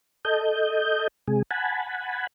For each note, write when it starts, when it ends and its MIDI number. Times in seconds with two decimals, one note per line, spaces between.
0.25 1.08 69
0.25 1.08 75
0.25 1.08 91
1.28 1.42 48
1.28 1.42 56
1.28 1.42 68
1.51 2.27 78
1.51 2.27 80
1.51 2.27 81
1.51 2.27 83